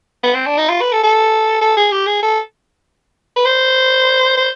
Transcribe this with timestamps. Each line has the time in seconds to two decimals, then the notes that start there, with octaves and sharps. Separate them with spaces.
0.24 B3
0.35 C4
0.46 D4
0.58 D#4
0.69 F4
0.81 B4
0.92 A4
1.04 A4
1.61 A4
1.77 G#4
1.92 G4
2.07 G#4
2.23 A4
3.36 B4
3.45 C5
4.38 C5